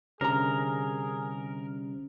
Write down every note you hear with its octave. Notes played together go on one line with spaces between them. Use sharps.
C2 D3 C#4 G#4 A#4 A#5